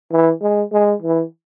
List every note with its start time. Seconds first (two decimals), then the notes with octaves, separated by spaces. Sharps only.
0.11 E3
0.42 G#3
0.72 G#3
1.02 E3